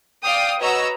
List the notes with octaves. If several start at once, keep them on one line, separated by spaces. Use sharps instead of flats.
D5 F5 G5 D#6
F#4 B4 C#5 D#5 A#5 E6